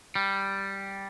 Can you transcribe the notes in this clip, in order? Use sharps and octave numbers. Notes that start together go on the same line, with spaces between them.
G3